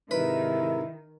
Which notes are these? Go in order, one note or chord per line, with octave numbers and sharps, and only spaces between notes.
G#2 C3 D#3 E4 A#4 B4